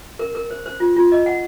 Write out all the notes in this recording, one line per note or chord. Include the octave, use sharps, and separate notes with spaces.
A#4
A#4
C5
C5
F4
F4
D#5
F#5